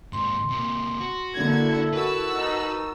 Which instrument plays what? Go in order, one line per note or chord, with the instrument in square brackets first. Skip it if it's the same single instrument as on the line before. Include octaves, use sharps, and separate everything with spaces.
[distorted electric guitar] G#2 C3 [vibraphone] C6
[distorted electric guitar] C3 A#3
F#4
[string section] D3 A#3 G#6 [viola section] E4 A4
[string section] F#4 A5 E6 [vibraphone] A#4 C#6 [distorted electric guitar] B4
[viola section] D#4